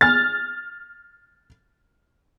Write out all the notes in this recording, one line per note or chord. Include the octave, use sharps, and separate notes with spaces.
F6 A6